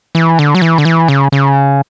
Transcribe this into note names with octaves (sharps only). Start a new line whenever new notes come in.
E3
D3
F#3
E3
D3
E3
C#3
C#3